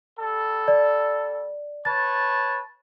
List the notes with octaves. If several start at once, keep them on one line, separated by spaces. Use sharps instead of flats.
G3 A4
D5
B4 C#5 A5 A6